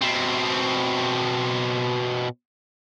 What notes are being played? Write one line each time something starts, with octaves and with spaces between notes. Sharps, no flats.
B2 C4